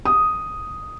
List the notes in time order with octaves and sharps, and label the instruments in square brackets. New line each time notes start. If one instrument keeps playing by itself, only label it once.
[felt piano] D#6